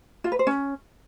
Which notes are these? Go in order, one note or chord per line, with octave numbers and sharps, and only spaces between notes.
F4
B4
C5
C#4